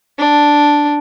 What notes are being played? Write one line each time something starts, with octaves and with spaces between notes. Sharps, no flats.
D4